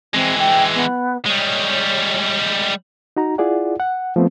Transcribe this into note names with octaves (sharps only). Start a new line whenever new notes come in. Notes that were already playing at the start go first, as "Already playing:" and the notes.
E3 G#3 C4
G5
B3
G3 G#3 C#5
D#4 F#4 A#5
E4 F4 G#4 D5 F#5
F#5
F3 A3 B3 C4